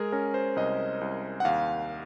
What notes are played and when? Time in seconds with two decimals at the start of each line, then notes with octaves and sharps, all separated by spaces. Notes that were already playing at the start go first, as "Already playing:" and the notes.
Already playing: G#3 G#4 A#4
0.12 C#4 A#4
0.34 C5
0.56 C2 D#5
1.01 C2
1.40 F#5
1.45 D#2 F5